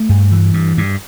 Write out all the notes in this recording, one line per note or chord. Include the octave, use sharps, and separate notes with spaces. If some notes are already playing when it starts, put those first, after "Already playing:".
Already playing: A3
G2
E3
G2
G2